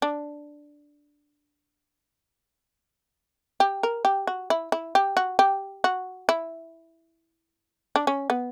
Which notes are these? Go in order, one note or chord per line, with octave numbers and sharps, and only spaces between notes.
D4
G4
A#4
G4
F#4
E4
E4
G4
F#4
G4
F#4
E4
D4
C#4
B3